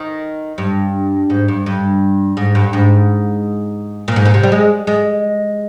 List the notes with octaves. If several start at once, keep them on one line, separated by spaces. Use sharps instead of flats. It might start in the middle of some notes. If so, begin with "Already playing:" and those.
Already playing: D#3
G2
G#2
G2
G2
G#2
G2
G#2
A#2
G#2
A#2
C3
G3
G#3
G#3